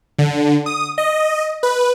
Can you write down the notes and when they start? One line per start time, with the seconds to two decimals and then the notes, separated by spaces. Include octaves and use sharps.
0.18 D3
0.66 D#6
0.98 D#5
1.63 B4